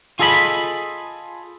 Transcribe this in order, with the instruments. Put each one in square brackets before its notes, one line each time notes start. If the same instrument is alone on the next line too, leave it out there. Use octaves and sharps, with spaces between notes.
[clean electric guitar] F4 G#4 A4 D#5 A#5 B5